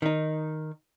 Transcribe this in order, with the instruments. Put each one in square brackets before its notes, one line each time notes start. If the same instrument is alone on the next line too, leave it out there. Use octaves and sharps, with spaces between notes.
[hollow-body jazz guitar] D#3 D#4